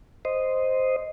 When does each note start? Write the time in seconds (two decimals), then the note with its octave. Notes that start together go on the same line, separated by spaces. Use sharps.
0.25 C5 D#5